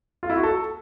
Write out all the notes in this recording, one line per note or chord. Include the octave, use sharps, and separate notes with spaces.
F4
E4
F#4
A4